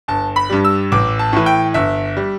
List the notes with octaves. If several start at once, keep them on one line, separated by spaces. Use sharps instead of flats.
G1 A5
B5
G2 G3
E6
A1 D6
A5
A2 E3
G5
G1 E5
G3